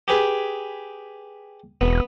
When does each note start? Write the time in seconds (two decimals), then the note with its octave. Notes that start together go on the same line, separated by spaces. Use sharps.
0.08 G4 G#4 B4
1.81 E1 B3